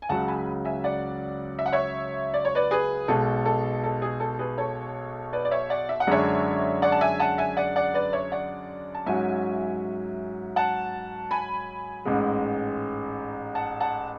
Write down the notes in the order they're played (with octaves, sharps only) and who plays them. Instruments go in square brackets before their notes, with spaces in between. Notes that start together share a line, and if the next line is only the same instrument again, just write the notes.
[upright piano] G#5
[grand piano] C#2 C#3 F#3 [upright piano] F#5 A5
[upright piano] G#5 B5
E5 G#5
D5 F#5
E5
F#5
C#5 E5
D5
C#5
B4 D5
G#4 B4
[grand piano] B1 B2 G#3 [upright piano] A4
[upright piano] A4
A4
G#4
A4
G#4 B4
A4 C#5
B4 D5
D5
C#5 E5
D5 F#5
E5
F#5
[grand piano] F#2 D3 G#3 D4 G#4 [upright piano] C#5 E5
[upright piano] D5 F#5
A5
E5 G#5
F#5 A5
E5 G#5
D5 F#5
D5 F#5
B4 D5
C#5 E5
D5 F#5
A5
[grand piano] G#2 F#3 C#4 F#4 [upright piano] E5 G#5
[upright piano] F#5 A5
G#5 B5
[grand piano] A1 G#2 G#3
[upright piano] F#5 A5
F#5 A5